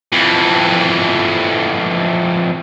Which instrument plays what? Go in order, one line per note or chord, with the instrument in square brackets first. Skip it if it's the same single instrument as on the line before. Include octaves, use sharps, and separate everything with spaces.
[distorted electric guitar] F2 E3